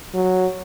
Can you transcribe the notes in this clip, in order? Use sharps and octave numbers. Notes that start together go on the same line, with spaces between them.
F#3